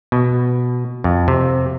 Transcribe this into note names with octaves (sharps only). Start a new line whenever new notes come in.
B2
F2
C3